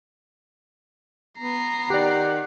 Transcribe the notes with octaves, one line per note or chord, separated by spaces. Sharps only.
B3 A#5 C7
D#3 G4 D5 F#5